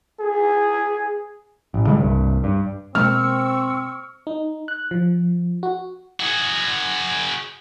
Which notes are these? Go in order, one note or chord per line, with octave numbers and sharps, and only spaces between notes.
G#4
A1
C#3 G3 G#3
C2 G2
G2
B2 G#3 A#3 C4 C#6 E6 F6
D#4
F#6
F3
F#4
F#4 G#4